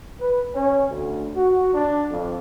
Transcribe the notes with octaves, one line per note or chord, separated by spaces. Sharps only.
B4
C#4
D2
F#4
D4
F2